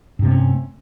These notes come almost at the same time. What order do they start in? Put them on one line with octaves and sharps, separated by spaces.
G2 C3 A3 C#4